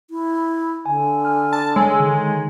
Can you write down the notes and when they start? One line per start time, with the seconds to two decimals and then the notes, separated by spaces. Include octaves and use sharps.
0.10 E4
0.86 D3 G#5
1.25 G#5 F6
1.53 A5
1.76 G#3 C#5 G#5 E6
2.00 D3 D#3